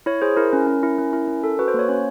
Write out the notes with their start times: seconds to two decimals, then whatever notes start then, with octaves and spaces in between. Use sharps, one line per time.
0.06 E4 C#5
0.22 G#4 C5
0.37 E4 A#4
0.53 C#4
0.67 C#4
0.83 E4
0.98 C#4
1.13 E4
1.28 C#4
1.44 A4
1.59 F#4 B4
1.68 C5
1.74 A#3 C#5
1.89 C#4 C#5